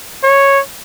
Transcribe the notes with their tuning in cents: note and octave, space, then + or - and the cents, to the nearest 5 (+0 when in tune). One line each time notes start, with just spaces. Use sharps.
C#5 -5